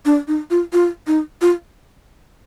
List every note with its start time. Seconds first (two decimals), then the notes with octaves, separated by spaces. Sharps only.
0.05 D4
0.28 D#4
0.50 F4
0.73 F4
1.07 D#4
1.42 F4